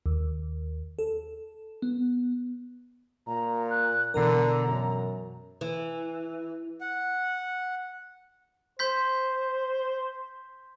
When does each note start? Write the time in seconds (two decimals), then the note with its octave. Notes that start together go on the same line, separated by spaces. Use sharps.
0.06 D#2
0.99 A4
1.82 B3
3.27 A#2 A#5
3.70 F#6
4.14 B2 D3 E3 A#4 A#5
4.67 F#2
5.61 E3
6.81 F#5
8.79 C5 C6 G6 B6